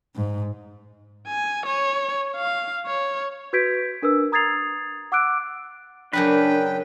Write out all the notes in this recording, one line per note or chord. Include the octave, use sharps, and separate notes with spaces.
G#2
G#5
C#5
F5
C#5
F#4 B4 G6 G#6 B6 D7
D4 A#4 B4 E6
A#5 D#6 G#6 A6 C7 F7
F#5 D6 E6 F#6 D7
F#2 C#3 F#3 D4 B4 G5